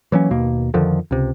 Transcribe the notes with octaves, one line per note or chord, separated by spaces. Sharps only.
E3 F#3 A#3 C#4
D#2 B2 A#3
F2 D3 D#3 F3
C#2 C3